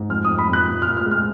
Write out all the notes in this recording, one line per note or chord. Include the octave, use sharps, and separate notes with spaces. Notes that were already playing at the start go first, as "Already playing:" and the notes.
Already playing: G#2
F2 F6
F2 D#6
B5
F2 F#6
A#2
F6
A#2
F6
G#3
F6